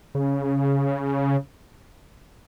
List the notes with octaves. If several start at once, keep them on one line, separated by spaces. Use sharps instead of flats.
C#3